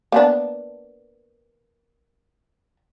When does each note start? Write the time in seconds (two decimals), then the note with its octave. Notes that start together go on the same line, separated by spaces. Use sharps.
0.12 A#3 B3 D4